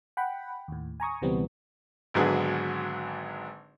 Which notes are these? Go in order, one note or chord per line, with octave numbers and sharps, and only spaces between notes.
F#5 G5 B5
D#2 A2
G#5 A#5 C#6 D#6
C#2 B2 E3 G3 B3 C4
G#1 G#2 D3 F#3 B3 G#4